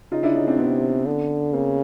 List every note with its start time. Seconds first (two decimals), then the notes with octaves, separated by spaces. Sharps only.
0.12 C#3 D#4 F4
0.23 D4 E4
0.35 C#4 D#4
0.47 C4 D4
0.58 C3 B3 C#4
1.06 D3
1.53 C#3 A#3 C4